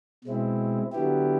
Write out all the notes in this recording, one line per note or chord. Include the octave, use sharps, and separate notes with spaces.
B2 G#3 C4 E4
D3 F#3 B3 E4 G4